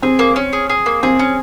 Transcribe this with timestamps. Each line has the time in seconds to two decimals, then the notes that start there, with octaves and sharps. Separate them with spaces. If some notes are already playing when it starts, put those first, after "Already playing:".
0.02 C4 G#4
0.19 A#3
0.36 C#4
0.53 G#4
0.70 G#4
0.86 A#3
1.03 C4 G#4
1.19 C#4